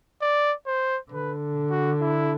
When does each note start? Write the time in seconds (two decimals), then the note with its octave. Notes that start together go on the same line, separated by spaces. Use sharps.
0.22 D5
0.67 C5
1.11 D3 B4
1.71 F#4
2.01 E4